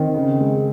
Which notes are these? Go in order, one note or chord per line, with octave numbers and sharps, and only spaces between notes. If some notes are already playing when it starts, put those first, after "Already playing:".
Already playing: D#3 C4
C#3
G#3